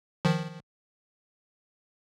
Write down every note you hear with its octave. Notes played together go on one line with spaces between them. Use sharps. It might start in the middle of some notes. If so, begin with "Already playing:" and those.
D#3 F3